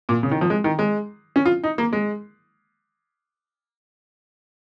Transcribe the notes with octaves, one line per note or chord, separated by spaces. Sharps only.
A#2
C#3
D#3
F3
G#3
D#3
G#3
C#4
F4
D#4
A#3
G#3